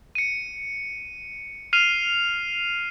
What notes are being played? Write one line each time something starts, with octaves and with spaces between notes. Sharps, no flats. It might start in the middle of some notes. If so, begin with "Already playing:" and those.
C#7 D#7
F6 C7 D#7 F7